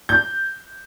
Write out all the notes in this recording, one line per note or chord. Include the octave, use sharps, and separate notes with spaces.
G6